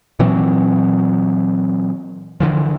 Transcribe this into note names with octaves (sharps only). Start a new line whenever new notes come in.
A#2 E3 F#3 C4
D3 E3 F3